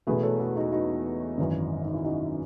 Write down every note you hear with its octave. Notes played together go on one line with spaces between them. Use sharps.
E1 E2 B2 A3 G#4 B4
A4 C#5
F#4 A4
D#4 F#4
D#4 F#4
G#1 F#2 E3
D#4
E4
D#4 F#4